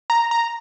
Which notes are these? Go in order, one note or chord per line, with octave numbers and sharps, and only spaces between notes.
A#5
A#5